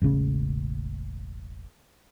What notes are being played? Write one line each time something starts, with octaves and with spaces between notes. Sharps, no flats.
E1 A1 C#3 C#4